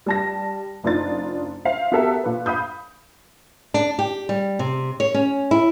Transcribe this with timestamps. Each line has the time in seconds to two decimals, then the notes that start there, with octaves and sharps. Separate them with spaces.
0.06 G3 A5 A#6
0.84 F#1 D4 D#4 F4 A6
1.65 C5 E5 F5
1.92 B3 F#4 G4 A4 A#4 E5
2.24 A#2 B4
2.46 F5 B5 D#6 G6
3.74 D4
3.99 G4
4.29 G3
4.59 C3
5.00 C#5
5.14 C#4
5.51 E4